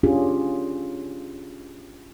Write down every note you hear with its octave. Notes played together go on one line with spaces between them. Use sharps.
C#4 D4 F4 G4 G#4